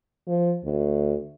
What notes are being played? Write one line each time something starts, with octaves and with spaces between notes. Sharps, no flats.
F3
D2